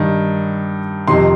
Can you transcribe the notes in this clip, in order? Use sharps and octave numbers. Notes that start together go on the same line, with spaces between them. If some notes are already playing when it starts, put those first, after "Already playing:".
Already playing: G2 D#3
F2 C3 D#3 C6